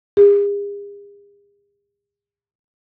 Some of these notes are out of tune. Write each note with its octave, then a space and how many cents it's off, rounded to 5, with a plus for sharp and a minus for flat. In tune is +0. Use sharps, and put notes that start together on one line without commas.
G#4 -45